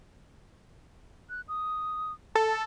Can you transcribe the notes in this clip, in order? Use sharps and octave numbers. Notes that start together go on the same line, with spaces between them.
F#6
D#6
A4 A5